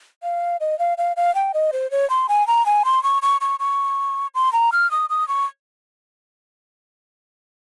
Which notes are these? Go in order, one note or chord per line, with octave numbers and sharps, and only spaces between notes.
F5
D#5
F5
F5
F5
G5
D#5
C5
C#5
C6
G#5
A#5
G#5
C6
C#6
C#6
C#6
C#6
C6
A#5
F6
D#6
D#6
C#6